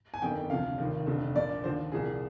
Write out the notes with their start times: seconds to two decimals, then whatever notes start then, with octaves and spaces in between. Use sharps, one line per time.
0.14 G#5
0.21 G1 F2 D#3 G5
0.50 D2 C3 F3 F5
0.78 F1 D#2 D#3
1.06 F1 F2 D3 F3
1.35 A#1 A#2 F3 D5
1.64 D#2 D3 F3 C5
1.92 C2 A#2 F3 G#4